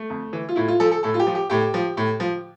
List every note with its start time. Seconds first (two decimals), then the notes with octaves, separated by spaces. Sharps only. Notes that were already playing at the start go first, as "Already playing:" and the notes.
Already playing: A3
0.10 F2
0.33 E3
0.49 F4
0.56 A2 E4
0.68 F4
0.80 F3 A4
0.91 A4
1.03 A2 A4
1.14 F4
1.20 G4
1.27 F3
1.35 G4
1.50 A2 G4
1.74 F3
1.97 A2
2.20 F3